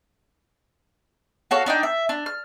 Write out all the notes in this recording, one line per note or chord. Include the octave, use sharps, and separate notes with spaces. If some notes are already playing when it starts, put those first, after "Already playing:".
F#4 A4 C#5 F5
D4 D#4 D5 G5
E5
D4
F6